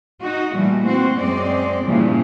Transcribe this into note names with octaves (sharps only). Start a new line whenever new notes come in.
D#4 F#4
A#2 E3 G3 A3
C4 F#4
F#2 G#3 C4 D5
G2 A#2 C#3 E3 F3